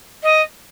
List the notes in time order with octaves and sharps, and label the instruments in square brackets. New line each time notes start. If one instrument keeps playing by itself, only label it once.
[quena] D#5